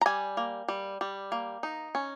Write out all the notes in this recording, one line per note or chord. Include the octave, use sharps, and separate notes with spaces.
A#5
G3 G#5
A#3
G3
G3
A#3
D#4
C#4